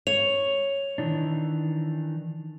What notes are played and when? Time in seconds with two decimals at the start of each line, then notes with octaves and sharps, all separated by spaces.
0.07 C#5 F7
0.98 D#3 E3 D4